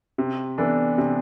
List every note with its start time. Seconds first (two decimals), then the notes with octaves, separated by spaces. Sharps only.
0.18 C3
0.58 E3 B3 D4 A4
0.98 C3